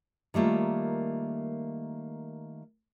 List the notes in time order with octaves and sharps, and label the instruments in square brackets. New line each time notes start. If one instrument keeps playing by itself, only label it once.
[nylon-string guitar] D#3 G3 A3 A#3 F4